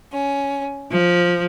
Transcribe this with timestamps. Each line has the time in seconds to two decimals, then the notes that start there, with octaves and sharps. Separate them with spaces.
0.11 C#4
0.91 F3